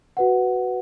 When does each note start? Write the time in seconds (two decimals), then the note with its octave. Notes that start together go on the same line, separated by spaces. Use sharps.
0.17 F#4 B4 F#5